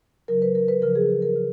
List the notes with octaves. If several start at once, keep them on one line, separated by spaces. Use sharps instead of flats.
C#3 F#3 A#4
B4
A#4
B4
C#3 F3 A#4
G#4
G#4
A#4
C#3 F3